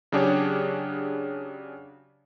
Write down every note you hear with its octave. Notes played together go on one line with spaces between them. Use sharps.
C#3 F#3 D4 G4 G#4 C#5